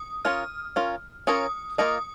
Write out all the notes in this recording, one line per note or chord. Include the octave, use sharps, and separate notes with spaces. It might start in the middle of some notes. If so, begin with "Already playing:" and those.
Already playing: D#6
C#4 F4 A#4 C#5 F6
C#4 F4 A#4 C#5
C#4 F4 A#4 C#5 D#6
A#3 F4 A#4 D#5 D#6